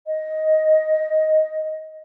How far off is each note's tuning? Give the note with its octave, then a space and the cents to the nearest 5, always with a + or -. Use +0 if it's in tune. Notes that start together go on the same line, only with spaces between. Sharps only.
D#5 +5